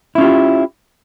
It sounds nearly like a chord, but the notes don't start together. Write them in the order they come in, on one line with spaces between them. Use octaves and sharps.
E4 C#4 F4 G4